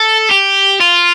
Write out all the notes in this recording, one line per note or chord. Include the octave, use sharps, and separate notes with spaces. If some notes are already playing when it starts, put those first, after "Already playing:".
Already playing: A4
G4
F4